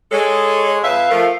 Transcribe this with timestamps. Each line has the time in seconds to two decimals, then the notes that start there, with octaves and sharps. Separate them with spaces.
0.12 G#3 A4 C#5
0.83 F2 B4 E5 F5
1.10 F3 A3 A#4